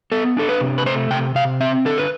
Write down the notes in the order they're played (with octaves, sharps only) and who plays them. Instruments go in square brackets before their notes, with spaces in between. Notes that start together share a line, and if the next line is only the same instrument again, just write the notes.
[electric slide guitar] B3 A4
D4 A4
B4
C3
B4
A3 C5
C3 G5
C3 F5
C4 E5
D3 A4
B4